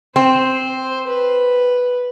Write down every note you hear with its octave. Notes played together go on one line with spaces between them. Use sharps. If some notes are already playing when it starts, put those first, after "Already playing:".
C4 C5
B4